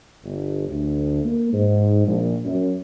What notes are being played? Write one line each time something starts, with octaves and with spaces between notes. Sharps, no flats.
G1
D2
A#3
G#2
A#1
F#2